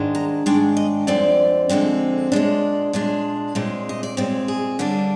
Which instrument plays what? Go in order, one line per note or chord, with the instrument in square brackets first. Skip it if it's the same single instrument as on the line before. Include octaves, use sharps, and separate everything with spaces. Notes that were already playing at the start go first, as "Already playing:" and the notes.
Already playing: [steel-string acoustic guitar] G#2 D#3 G#3 D4
A#5
G#2 D#3 G#3 D4 G5
D#5
F2 D3 G#3 C4 D5
F2 D3 G#3 C4
A#2 G#3 D4 D5
A#2 G#3 D4
A#2 G#3 C4
D#5
D5
A#2 G#3 C4 C5
G#4
D3 G3 A#3 D4